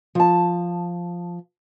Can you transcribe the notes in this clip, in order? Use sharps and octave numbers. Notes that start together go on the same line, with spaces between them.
F3 A5